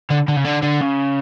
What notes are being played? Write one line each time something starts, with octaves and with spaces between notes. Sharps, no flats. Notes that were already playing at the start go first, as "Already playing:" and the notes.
D3
D3
C#3
D3
D3
C#3